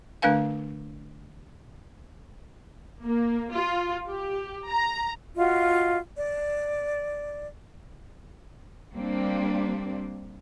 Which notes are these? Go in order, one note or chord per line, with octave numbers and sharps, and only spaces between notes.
D3 A3 D4 B4 F5 G#5
A#3
F4
G4
A#5
F4 F#4 D#5 F5
D5
G3 A#3 C4 D4